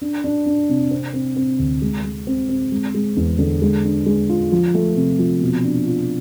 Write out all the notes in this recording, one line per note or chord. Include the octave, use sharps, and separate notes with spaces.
D4
D4
D4
C3
C4
C4
C4
D2
G#3
G#3
C4
C4
G#3
G#3
E2
D3
G#3
D4
G#3
F4
F3
A3
C3
F3
B2
D4
F4